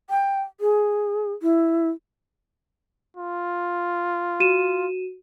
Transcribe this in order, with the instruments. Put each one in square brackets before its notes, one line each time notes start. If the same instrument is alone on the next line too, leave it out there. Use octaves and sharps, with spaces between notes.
[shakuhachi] G5
G#4
E4
[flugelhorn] F4
[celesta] F#4 D#7 E7